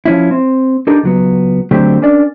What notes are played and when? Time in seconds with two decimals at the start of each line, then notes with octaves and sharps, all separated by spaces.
0.06 F3 C#4 E4
0.31 C4
0.87 D4 D#4 G4 A4 A#4
1.03 C#2 F#3 B3
1.71 D3 F#3 A3 C4 G4
2.02 C#4 D4 A#4 D5